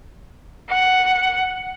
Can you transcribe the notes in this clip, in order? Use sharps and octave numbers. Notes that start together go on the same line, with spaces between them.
F#5